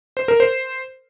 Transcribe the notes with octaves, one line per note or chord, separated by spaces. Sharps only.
C5
A#4
C5